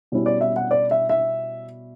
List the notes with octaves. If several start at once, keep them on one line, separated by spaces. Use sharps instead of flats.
B2 G3 C#4 E4
D5
E5
F#5
D5
E5
E5